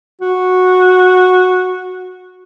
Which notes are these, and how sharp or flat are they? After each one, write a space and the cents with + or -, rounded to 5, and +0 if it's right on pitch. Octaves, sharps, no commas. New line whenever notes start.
F#4 -10